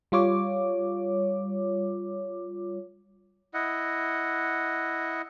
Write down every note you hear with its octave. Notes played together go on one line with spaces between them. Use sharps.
G3 F4 C#5 D6
E4 D#5 F#5